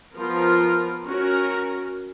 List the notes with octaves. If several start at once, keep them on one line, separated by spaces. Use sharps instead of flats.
F3 B3 F4 A#4
C#4 F#4 A#4